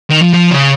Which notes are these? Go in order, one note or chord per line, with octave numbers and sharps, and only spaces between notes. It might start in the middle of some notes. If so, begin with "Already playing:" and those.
D#3
F3
F3
C#3